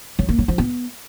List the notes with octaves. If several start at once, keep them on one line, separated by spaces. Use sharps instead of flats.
F#3
A#3
F#3
F3
B3